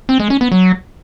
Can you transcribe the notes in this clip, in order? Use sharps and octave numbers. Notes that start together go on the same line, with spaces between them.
C4
G#3
C#4
B3
F#3